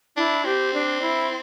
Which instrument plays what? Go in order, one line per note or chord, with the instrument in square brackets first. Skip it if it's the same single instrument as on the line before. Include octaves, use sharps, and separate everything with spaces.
[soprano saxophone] D4 [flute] E4
[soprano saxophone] C4 [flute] G4
[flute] D4
E4